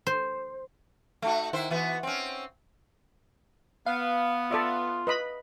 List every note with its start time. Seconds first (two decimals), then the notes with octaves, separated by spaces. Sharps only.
0.07 C5
1.22 A3 D#4 F#4
1.53 D#3 E4 C5
1.70 E3 B3 F#4
2.03 C4 C#4
3.86 B3 F5
4.51 F4 A4 D5 E5
5.07 B4 D#5 B5